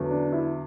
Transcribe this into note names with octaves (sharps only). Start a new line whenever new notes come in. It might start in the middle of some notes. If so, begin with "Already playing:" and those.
Already playing: E2 D3 F#3
D4
E4